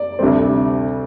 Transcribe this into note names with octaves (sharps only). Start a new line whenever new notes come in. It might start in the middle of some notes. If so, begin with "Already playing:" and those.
Already playing: D5
D2 C3 G3 C4